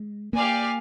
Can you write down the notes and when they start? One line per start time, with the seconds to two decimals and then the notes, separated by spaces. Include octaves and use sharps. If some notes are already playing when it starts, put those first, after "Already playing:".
Already playing: G#3
0.33 A#3 G4 D5 F5 G#5